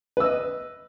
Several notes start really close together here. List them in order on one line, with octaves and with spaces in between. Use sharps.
B4 E6 D#5